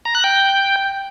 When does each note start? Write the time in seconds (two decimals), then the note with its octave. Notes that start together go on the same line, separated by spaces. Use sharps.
0.05 A#5
0.15 F#6
0.24 G5